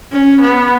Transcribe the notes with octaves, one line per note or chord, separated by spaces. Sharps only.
C#4
B3